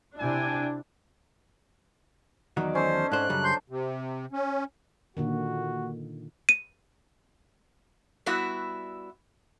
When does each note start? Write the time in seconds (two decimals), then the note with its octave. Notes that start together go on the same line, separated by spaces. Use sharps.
0.19 C3 D4 E4 G5 G#5
2.57 E2 D#3 F#3 D#4 D5
2.75 C#4 A4 C5
2.92 D#5
3.12 G#2 D4 A4 C5 F5 F#6
3.29 F#2 C#3 F#3 G3
3.44 C5 C6 G6
3.70 C3
4.32 C#4
5.17 A#2 D3 D#3 F#4
6.49 D#7
8.26 G3 B3 E4 F#4 E5